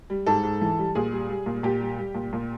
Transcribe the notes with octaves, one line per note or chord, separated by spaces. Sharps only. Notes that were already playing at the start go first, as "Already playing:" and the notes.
G3
G#2 A4
G#2
E3
G3
A#2 G#4
G3
G3
A#2
A#2 G4
G3
G3
A#2
A#2